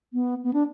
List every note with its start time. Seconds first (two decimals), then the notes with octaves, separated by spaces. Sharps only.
0.13 B3
0.44 B3
0.53 D4